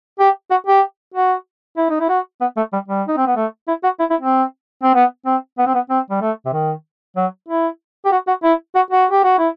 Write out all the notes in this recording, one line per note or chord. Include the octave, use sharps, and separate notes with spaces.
G4
F#4
G4
F#4
E4
D#4
E4
F#4
B3
A3
G3
G3
D#4
C4
B3
A3
E4
F#4
E4
E4
C4
C4
B3
C4
B3
C4
B3
C4
G3
A3
C3
D#3
F#3
E4
G4
F#4
F#4
E4
F#4
F#4
G4
F#4
E4